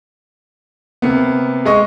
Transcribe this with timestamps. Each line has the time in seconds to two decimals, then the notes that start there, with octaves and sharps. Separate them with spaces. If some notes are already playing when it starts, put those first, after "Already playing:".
1.02 C3 A#3 B3
1.65 G#3 D#5 C#6